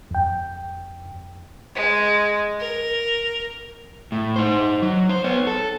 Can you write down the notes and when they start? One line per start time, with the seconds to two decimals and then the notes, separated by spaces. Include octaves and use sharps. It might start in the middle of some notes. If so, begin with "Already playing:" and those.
0.11 F2 G5
1.75 G#3
2.60 A#4
4.12 A2
4.36 D#4 C5
4.82 F#3
5.09 C5
5.24 B3 C#5
5.47 A4